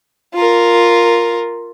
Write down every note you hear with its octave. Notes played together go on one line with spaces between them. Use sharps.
F4 A#4